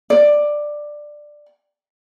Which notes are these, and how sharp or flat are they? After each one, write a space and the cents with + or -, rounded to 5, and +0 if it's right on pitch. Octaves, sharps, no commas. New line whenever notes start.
D5 +10